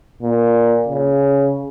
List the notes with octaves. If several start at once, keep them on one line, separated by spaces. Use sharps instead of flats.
A#2
C#3